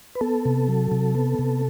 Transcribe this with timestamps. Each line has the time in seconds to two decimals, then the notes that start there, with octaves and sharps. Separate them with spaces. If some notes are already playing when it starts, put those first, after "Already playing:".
0.15 B4
0.21 B3 A4
0.45 C3
0.68 F#3
0.92 C3
1.15 B3
1.39 C3